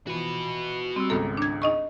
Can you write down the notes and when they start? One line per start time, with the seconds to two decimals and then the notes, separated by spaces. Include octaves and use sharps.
0.07 E3 F3 F#4 B4
0.96 G3 C4 E6
1.10 G#1 C#2 B3 A4 A#5
1.37 D4 G#6
1.62 D#4 D#5 C#6